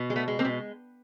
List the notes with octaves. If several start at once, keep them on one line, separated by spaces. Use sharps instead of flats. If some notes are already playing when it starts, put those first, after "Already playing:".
Already playing: B2
G#3
A3 B3
G#3
A#3 C4
B2